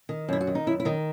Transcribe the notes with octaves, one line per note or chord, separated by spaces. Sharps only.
D#3
F#2 E4
F#4
D#3
D#4
F#2 E4
E4
D#3 D#4